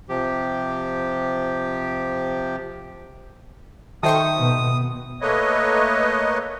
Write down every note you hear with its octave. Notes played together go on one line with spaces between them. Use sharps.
C3 F3 G4
D#3 A4 C5 E5 G5 C#6 D#6
B2 B3
A3 A#3 B4 C#5 D#5